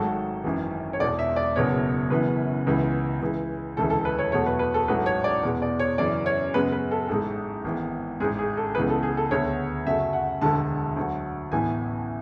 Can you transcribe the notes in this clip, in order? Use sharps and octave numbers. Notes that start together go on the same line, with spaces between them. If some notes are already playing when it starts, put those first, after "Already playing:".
Already playing: G#1 G#2 F#3 A3 A4
G#1 F#2 E3
C#5
E1 E2 B2 D5
E5
D5
F#1 E2 B2 G#3 B3 C#5
F#1 F#2 E3 B3 B4
C#2 C#3 E3 B3
C#2 C#3 E3
E1 D2 C#3 E3 A4
A4
B4
C#5
E2 B2 F#3 A3 C#5
B4
B4
A4
A1 G#2 F#3 A3 B4
C#5
D5
E2 B2 G#3 B3
D5
C#5
F#2 C#3 E3 D5
C#5
F#2 C#3 G#3 B3 B4
B4
A4
A1 G#2 G#3 A4
G#1 G#2 E3 B3
A1 G#2 G#3 G#4
G#4
A4
C#2 C#3 E3 B3 B4
A4
G#4
A4
D2 D3 G#3 B3 C#5
F#2 C#3 F#3 A3 E5
F#5
E1 D2 D3 G#3 A5
D2 D3 F#3
A1 A2 E3 B3 G#5